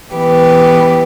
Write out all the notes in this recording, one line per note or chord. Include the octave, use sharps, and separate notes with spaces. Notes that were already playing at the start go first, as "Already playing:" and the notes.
E3 B3 G4 B4